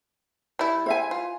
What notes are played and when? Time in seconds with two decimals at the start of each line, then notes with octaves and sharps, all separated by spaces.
0.59 G3 E4
0.86 C5 E5 G#5
1.11 F4